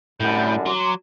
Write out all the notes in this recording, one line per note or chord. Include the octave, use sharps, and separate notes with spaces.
C2 F#2 A2 D3 B5 G6
F#3 A#5 C6 D6